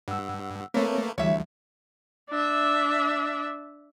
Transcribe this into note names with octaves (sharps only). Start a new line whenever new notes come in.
G2 F#5 E6
A3 A#3 C4 A#4 B4 C#5
D2 E3 G3 C#5 E5
D4 E5